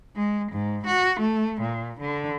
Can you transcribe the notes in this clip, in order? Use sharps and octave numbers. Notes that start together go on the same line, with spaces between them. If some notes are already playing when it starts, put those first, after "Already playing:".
G#3
G#2
F#4
A3
A#2
D3